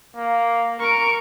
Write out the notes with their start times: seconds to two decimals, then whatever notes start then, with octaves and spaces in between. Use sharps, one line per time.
0.16 A#3
0.80 A#4 C#6 D7